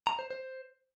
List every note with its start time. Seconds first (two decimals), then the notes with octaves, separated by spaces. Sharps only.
0.07 A#5
0.19 C5
0.31 C5